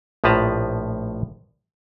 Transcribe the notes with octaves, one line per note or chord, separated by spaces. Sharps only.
A#1 A2 F3 B4 A5 A#5